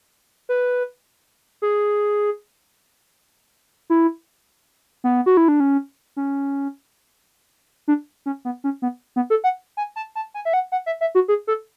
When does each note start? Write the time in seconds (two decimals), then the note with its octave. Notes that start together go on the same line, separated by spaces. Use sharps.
0.49 B4
1.62 G#4
3.90 E4
5.04 B3
5.26 F#4
5.37 E4
5.48 D4
5.60 C#4
6.16 C#4
7.88 D4
8.26 C#4
8.45 B3
8.64 C#4
8.82 B3
9.16 B3
9.30 A4
9.44 F#5
9.77 G#5
9.96 A5
10.16 A5
10.34 G#5
10.45 E5
10.53 F#5
10.72 F#5
10.86 E5
11.01 E5
11.15 F#4
11.28 G#4
11.47 A4